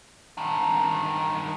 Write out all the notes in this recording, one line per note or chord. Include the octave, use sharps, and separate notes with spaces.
G2 D#3